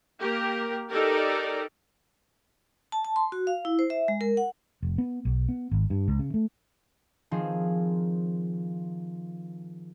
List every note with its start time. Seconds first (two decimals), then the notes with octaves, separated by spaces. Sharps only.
0.18 A#3 G4 A#4
0.91 D#4 G4 A4 A#4 D5
2.92 A5
3.05 A5
3.16 C6
3.32 F#4
3.47 F5
3.65 E4
3.79 C5
3.90 E5
4.08 G#3
4.21 A#4
4.37 F#5
4.83 F1
4.98 B3
5.25 B1
5.49 B3
5.71 G#1
5.90 G2
6.08 C#2
6.19 C#3
6.34 A3
7.31 D#3 F3 C4 D#4 G#4